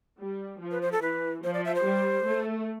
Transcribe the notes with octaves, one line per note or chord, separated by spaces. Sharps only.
G3
F3
B4
C5
A4
E3 B4
F3 C5
D5
E5
C5
G3
A3